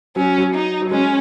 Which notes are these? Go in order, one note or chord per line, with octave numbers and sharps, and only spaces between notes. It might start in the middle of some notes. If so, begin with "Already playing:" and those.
F#3 C#4
F#3
D#4
F#3
G#3 C#4